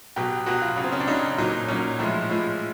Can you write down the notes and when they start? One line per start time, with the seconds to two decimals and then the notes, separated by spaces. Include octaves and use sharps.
0.16 B2 F#3 G4
0.46 B2 F#3 F#4
0.62 F4
0.77 C#3 F#3
0.84 C4
0.92 C#4
1.00 D4
1.07 C#3 F#3 D#4
1.38 A#2 F#3 D#4
1.68 A#2 F#3 C#4
1.99 A2 F3 G#3
2.29 A2 F3 G#3